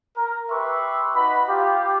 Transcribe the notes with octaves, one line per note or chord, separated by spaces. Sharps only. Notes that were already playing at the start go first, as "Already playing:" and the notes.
A#4
G4 B4 E5 C6 C#6
D#4 F#4 B4 B5
F4 G4